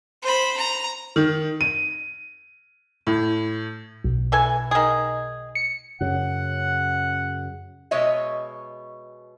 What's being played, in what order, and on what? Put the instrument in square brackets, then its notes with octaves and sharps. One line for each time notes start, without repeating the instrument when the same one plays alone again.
[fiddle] C5 B5
A#5
[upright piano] D#3
D#7
A2
[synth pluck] B1
[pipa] E3 A4 G#5
D#3 G#4
[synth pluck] C#7
[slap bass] F#2 C#3 [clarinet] F#5
[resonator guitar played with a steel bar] B2 G#3 C#5 D#5 E5